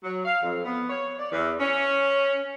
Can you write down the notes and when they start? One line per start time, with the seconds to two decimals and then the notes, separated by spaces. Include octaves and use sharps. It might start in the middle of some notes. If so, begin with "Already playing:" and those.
0.04 F#3
0.25 F5
0.42 F2
0.64 B3
0.89 C#5
1.19 D5
1.32 E2
1.60 C#4